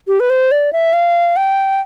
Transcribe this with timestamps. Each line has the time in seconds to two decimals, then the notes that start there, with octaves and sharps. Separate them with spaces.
0.08 G4
0.20 B4
0.30 C5
0.51 D5
0.73 E5
0.93 F5
1.36 G5